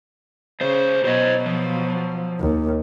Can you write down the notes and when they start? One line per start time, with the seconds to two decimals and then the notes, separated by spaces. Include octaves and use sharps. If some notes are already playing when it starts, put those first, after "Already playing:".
0.61 C#2 C#3 C5
1.05 B2 F#3 C5 D#5
1.46 F3
2.40 D#2